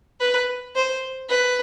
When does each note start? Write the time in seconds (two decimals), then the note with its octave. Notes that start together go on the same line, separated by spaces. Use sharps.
0.20 B4
0.76 C5
1.29 B4